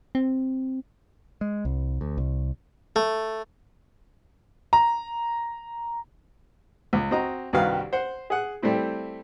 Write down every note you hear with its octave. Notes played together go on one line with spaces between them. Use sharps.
C4
G#3
C2
D2
C2
A3
A#5
C#2
C4 F#4 D#5 A#5
C2 G2 D#3 F#4 B4 F5
C5 F#5
G#4 F#5
G3 A3 C4 E4